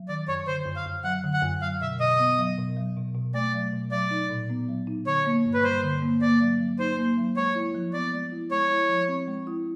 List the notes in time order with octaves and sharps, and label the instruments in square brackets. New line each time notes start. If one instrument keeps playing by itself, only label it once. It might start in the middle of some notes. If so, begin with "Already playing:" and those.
Already playing: [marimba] F#3
[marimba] D#3 [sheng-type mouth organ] D5
[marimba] F#2 [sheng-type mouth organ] C#5
[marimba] D3 [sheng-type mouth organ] C5
[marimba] F#2
[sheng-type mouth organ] F5
[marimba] F#2
[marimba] F#3 [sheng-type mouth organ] F#5
[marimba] D3
[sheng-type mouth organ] F#5
[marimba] F#2
[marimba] F#3 [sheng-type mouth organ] F5
[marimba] B2 [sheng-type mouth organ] E5
[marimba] B2 [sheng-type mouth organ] D#5
[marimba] B3
F#3
B2
F#3
B2
B2
[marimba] A3 [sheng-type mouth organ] D5
[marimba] F#3
B2
[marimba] F#3 [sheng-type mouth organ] D5
[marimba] D#4
A#2
B3
F#3
D#4
[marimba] D3 [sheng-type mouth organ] C#5
[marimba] A#3
G2
[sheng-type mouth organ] B4
[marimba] G3 [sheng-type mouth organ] C5
[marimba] D3
A#3
[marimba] A#3 [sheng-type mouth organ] D5
[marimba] F#3
F#3
[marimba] D#4 [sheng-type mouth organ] C5
[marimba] A#3
F#3
[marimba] G#3 [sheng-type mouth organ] C#5
[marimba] E4
F3
[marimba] B3 [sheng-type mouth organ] D5
[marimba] G#3
E4
[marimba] G#3 [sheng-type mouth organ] C#5
[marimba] E4
F3
C4
G#3
E4